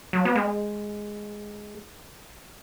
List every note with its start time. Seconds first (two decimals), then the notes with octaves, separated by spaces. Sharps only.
0.13 F#3
0.25 B3
0.35 G#3